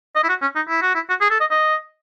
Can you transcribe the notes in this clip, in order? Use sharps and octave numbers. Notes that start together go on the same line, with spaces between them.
D#5
E4
F#4
C#4
D#4
E4
F#4
E4
F#4
G#4
A4
D#5
D#5